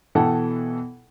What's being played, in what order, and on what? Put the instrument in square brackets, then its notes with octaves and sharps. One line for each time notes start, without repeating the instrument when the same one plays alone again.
[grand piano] B2 E3 A4 F#5 G5